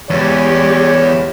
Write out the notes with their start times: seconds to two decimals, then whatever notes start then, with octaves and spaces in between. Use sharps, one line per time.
0.10 E2 G#3 G4 C#5